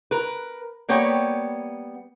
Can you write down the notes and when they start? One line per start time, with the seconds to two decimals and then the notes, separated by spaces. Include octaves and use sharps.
0.11 A#4 B4
0.89 G3 A#3 B3 C#5 G5